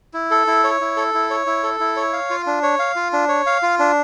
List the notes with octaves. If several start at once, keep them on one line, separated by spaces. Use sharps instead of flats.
E4
A4
E4
C#5
E4
A4
E4
C#5
E4
A4
E4
C#5
F5
F4
D4
C#5
F5
F4
D4
C#5
F5
F4
D4